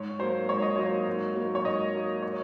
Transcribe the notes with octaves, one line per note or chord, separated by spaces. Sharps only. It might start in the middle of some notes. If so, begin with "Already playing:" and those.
Already playing: G#2 C#5
F#3 A#3 C5
G#2 C#5
D#5
F#3 A#3 C#5
G#2
F#3 A#3
C#5
G#2 D#5
F#3 A#3
C#5